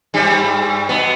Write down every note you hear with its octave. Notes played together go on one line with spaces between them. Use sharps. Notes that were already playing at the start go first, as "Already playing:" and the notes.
G2 G3
B2 B3